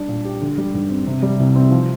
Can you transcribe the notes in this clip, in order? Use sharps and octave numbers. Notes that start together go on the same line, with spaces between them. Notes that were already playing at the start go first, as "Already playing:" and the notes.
Already playing: G3 D4
A#2
G4
D3
G3
G2
C4
C3
G3
C2
C4
F3